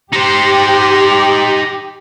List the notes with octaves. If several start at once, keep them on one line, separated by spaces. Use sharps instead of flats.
D#4 G4 C5